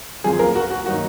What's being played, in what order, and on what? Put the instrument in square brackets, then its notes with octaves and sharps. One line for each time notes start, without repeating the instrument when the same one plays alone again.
[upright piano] F#2 F3 C4 G#4
A#3 A#4
F#4
F#4
D#3 F#3 A#3 D#4 F#4